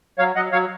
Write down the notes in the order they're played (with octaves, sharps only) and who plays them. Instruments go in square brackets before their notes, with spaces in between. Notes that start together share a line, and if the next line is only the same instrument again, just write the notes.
[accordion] F#3 C#5 F5
F#3 D#5 F#5
F#3 C#5 F5